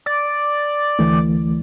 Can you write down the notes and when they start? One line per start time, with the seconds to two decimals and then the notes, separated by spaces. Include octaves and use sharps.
0.06 D5
0.99 D2 E3 A3